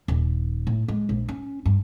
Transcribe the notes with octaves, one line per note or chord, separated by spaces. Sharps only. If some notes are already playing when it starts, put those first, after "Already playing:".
D#1
A2
G#3
A#1
C#4
G2